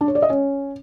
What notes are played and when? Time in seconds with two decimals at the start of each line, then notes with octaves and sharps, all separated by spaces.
0.01 D4
0.08 C#5
0.15 D5
0.22 D#5
0.30 C#4